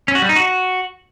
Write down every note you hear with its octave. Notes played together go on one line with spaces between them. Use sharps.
C#4
F#4
G3
D#4
F#4